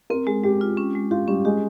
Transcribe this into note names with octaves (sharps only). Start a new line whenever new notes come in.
C4 A#4
G#3 G#4
G#3 G4
F4
C#4
G#3
F4 G4
G3 C#4
G#3 G4